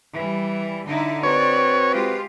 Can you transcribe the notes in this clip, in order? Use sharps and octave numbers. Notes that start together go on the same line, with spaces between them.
E3 G3
D3 D#4 E4
C4 F#4 B4 C#5 D5
G#3 F4 G4